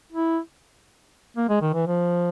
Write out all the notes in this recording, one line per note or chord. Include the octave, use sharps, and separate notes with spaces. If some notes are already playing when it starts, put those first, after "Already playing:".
E4
A#3
G#3
D#3
E3
F3